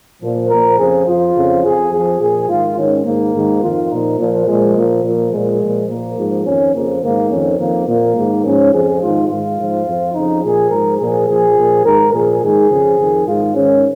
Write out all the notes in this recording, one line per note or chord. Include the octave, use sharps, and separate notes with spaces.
A#2 F3
A#2 F3 A#4
F2 C#3 F3 G#4
F2 F3 F4
F2 C#3 F3
F2 F3 G#4
F2 F3 G#4
A#2 F3 G#4
G#2 D#3 F4
G#2 D#3 C#4
G#2 D#3 A#3
G#2 D#3
F2 D#3 F4
A#2 F3 D#4
A#2 F3
A#2 F3 G#3
A#2 F3 A#3
A#2 F3
A#2 F3 G#3
A#2 F3
A#2 F3 A#3
G#2 F3
F2 D#3 C#4
F2 C#3 F3 A#3
G#2 D#3 A#3
F2 D#3 C#4
F2 D#3 A#3
A#2 F3 A#3
G#2 D#3
G#2 F3 C#4
F2 C#3 F3 G#4
G#2 D#3 F4
G#2 D#3 F4
G#2 F3
F2 F3
F2 C#3 F3 D#4
A#2 F3 G#4
G#2 F3 A#4
A#2 F3 G#4
A#2 F3 G#4
A#2 F3
G#2 D#3 A#4
A#2 F3 G#4
G#2 D#3 G#4
F2 C#3 F3
F2 D#3
G#2 D#3 F4
G#2 D#3 C#4